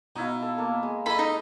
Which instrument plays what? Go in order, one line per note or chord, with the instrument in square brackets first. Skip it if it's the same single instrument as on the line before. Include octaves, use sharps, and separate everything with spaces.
[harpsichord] B2 [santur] D#4 E4 F5
[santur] A4
A#3 A4
G#3
[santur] E4 [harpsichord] A4 D#5 [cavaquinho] B5
[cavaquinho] D#4